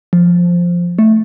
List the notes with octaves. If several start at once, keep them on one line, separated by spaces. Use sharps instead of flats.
F3
A3